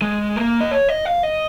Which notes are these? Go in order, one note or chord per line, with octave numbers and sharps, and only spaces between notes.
G#3
A#3
D#5
C#5
D#5
F5
D#5